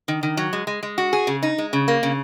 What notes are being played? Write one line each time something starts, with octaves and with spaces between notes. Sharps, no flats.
D#3
D#3
F#3
G#3
G#3
G#3
F#4
G#4
C#3
D#4
G#3
C#3
A#3
C#3